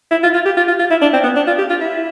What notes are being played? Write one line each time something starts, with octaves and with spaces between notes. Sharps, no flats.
E4
F4
F4
G4
F4
F4
F4
E4
D4
C4
B3
D4
F4
G4
F4
E4